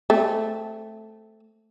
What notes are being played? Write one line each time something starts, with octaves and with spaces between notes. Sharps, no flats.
A3 C4